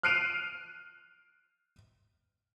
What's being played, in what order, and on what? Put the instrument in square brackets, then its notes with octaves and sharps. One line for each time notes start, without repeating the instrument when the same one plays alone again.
[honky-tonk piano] F6 F#6 C7 D7 D#7 F7